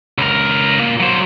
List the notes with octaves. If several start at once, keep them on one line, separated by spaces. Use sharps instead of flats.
C#2 A#4
A#2
F#3 C5